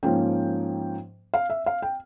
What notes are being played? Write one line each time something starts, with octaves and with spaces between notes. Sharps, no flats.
G#2 F3 A#3 C#4 G5
F5
E5
F5
G5